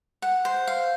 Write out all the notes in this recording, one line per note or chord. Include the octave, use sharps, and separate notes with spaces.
F#5
C5
F5